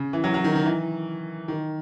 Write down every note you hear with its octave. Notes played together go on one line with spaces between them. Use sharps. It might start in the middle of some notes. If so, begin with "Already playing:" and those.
Already playing: C#3
E3
F#3
F#3
D#3
D#3
E3
D#3